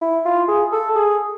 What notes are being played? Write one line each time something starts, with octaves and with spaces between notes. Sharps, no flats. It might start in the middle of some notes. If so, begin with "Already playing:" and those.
E4
F4
G#4
A4
G#4